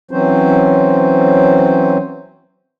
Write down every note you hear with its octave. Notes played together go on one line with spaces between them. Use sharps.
E3 F#3 C4 C#4 C5